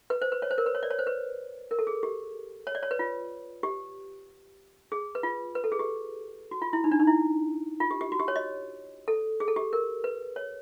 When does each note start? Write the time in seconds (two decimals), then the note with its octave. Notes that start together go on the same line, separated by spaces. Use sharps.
0.10 B4
0.22 C5
0.32 B4
0.42 C#5
0.51 C5
0.58 A#4
0.66 B4
0.75 C#5
0.83 D5
0.90 C#5
0.99 C5
1.07 B4
1.71 A#4
1.79 A4
1.87 G#4
2.03 G4
2.67 C#5
2.75 D5
2.83 C#5
2.91 B4
2.99 F4
3.63 G4
4.92 G#4
5.15 B4
5.23 F4
5.55 B4
5.64 A4
5.72 G#4
5.79 G4
6.51 F#4
6.62 F4
6.73 E4
6.84 D#4
6.92 D4
7.00 D#4
7.07 E4
7.80 F4
7.91 G4
8.01 G4
8.12 F#4
8.20 G4
8.28 C#5
8.36 D#5
9.08 A4
9.40 G#4
9.48 A4
9.56 G4
9.73 A#4
10.04 B4
10.36 C#5